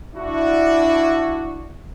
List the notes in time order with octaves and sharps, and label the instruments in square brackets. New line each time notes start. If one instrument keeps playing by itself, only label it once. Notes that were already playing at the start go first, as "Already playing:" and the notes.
[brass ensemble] D4 E4 F#4